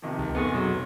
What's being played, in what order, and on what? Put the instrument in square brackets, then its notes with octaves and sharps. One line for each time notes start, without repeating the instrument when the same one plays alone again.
[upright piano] C3 D#3 F3
[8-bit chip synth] C#2
[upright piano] F1 [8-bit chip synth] B3 G#4 C#6
[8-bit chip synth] B2 F#3